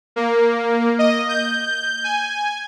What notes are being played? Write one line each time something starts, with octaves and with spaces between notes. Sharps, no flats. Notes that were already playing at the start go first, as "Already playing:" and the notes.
A#3
D#5
G6
G#5